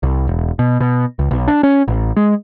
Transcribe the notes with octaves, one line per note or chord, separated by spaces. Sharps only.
C2
E1
B2
B2
C#2
B1
D4
C#4
A1
G#3